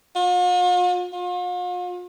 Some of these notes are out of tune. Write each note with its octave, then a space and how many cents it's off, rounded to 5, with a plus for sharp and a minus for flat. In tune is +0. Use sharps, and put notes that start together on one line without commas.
F4 +45
F4 +45